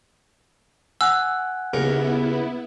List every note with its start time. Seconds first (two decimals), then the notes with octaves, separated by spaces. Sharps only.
1.01 F#5 G#5 E6 F#6
1.74 D#2 C#3 B3 E4 A#4